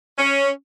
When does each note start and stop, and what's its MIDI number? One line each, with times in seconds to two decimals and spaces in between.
0.18 0.49 61